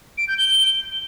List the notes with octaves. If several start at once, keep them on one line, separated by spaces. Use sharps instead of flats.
D7
G6
G7